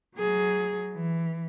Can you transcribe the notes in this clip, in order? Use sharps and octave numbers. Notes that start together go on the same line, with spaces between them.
F#3 G#4
E3